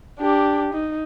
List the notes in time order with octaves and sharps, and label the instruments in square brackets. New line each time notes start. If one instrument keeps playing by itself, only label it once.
[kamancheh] D4 G4
D#4